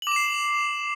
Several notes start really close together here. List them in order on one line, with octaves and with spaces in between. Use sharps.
F#7 D6 E7 C7